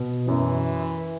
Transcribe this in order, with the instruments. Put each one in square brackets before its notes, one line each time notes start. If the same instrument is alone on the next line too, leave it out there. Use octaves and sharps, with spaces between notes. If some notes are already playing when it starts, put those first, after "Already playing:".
Already playing: [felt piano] B2
[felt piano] F#2 [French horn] E3